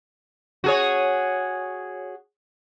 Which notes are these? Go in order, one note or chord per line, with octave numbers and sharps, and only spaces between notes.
F#4 G#4 C#5